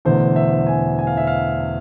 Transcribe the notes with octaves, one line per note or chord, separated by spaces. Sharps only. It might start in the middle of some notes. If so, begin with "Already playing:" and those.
E1 E2 D3 A3 C5
E5
G#5
G#5
F5
E5
F5